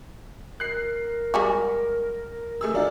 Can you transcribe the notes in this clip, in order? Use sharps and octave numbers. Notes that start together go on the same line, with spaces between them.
A#4 F#6 C7
G3 G#3 F#4
A3 G#4 E6
F#3 D4 F4 A#5